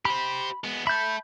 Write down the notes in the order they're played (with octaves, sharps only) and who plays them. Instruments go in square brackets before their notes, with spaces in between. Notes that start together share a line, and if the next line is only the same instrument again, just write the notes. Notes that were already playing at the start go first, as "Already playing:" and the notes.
[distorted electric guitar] G4 C5 [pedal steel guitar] B5
[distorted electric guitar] G#3 B3
[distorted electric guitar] E5 A5 [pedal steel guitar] B5 G6